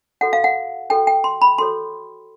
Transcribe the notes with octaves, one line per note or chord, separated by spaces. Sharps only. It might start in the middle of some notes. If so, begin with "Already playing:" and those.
F#4 A4 C#5 F#5
F5
F#5
F#4 A4 C#5 G5
G5
C6
B5
F#4 A4 C#5 C6